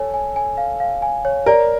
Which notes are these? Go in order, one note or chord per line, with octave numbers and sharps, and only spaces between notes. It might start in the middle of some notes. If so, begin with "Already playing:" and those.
Already playing: A4 C#5 G#5
G#5
G#5
F5
F5
G#5
C#5
A#4 D5